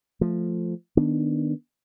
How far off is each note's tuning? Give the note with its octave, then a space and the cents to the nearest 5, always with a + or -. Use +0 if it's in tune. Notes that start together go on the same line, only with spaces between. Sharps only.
F3 +0 A3 +0
D#3 -5 B3 -10 D4 +0